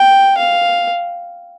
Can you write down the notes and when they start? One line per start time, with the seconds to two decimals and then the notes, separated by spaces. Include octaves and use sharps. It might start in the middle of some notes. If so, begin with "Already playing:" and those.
Already playing: G5
0.37 F5